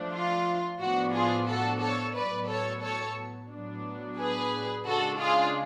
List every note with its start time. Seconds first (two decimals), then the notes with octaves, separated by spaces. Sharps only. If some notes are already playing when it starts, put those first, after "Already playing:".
Already playing: F3 A3 D4
0.12 F4
0.79 A2 F3 B3 D4 F#4
1.13 F4 G#4
1.48 F#4 A4
1.81 A4 C#5
2.15 A2 F#3 B3 B4 D5
2.48 A4 C#5
2.82 A4 C#5
3.50 A2 F#3 B3 D4
4.18 G#4 B4
4.86 C#3 G#3 D4 F#4 A4
5.19 F4 G#4